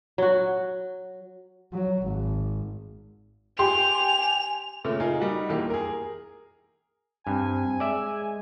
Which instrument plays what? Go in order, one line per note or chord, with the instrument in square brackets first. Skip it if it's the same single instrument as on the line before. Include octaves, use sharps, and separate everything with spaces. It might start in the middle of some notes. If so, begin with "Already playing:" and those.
[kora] F#3 F#4
[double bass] F#3
G#1
[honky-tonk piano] G4 C6 [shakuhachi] G#5 [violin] F7
[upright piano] A#2 C#3 A3
D#4 F4 G#4 A#4
G3 D#4 F#4
E1 E3 A#3 G4
G#4 A#4
[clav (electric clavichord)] G2 [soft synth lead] C4 [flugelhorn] G#5
[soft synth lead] G#3 [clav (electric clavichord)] D5 E5